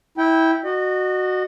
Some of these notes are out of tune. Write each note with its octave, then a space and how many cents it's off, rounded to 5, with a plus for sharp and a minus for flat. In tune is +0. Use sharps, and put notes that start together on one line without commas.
E4 -20 G5 +0
F#4 +0 D#5 -35